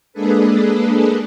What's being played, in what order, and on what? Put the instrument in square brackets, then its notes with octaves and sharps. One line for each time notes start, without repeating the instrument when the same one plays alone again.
[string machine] G#3 A#3 D4 G#4 A4 B4